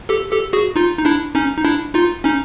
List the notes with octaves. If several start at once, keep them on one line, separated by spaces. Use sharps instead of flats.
G4 A4
G4 A4
F#4 G#4
D#4 F4
D#4
D4 E4
C#4 D#4
D#4
D4 E4
D#4 F4
C#4 D#4